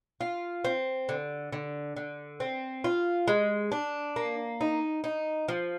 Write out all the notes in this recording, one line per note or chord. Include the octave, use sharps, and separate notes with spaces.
F4
C4
D3
D3
D3
C4
F4
G#3
D4
A#3
D#4
D#4
F3